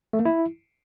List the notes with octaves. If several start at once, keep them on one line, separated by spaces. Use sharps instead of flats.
A3
A#3
E4